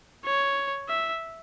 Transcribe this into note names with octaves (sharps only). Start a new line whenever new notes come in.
C#5
E5